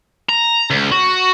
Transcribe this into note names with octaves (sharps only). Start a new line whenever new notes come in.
A#5
C#2
F#4